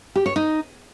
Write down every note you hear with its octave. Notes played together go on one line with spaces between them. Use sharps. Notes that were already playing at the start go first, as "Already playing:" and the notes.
G4
C#5
D#4